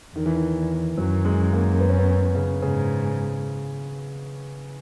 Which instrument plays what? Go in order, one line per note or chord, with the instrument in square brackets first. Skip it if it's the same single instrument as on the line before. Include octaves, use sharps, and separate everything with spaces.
[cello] E2 [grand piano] D#3
[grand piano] E3
D#3
[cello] F#2 [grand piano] F#3
[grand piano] G#3
A#3
B3
C#4
B3
C#3
[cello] G#2 [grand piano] C#3